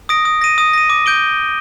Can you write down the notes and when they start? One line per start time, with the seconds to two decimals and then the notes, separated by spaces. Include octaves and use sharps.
0.09 D#6 A#6 D7
0.25 D#6
0.41 A#6 D#7
0.58 D#6
0.73 A#6 D#7
0.90 D6
1.06 G6 D7 G7